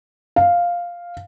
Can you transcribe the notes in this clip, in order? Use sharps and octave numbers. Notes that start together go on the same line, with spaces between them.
F5